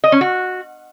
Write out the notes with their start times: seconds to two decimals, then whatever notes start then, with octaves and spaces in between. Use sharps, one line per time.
0.04 D#5
0.12 C#4
0.21 F#4